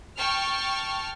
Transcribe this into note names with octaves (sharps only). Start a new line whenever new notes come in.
G5 A5 C#6 F6